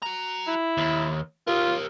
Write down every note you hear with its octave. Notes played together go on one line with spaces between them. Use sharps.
F#4 A#5
E4
D#2
F4 G4 A#4